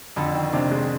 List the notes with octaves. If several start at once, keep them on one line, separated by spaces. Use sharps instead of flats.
F2 D3
D#3
C3 D4
G#3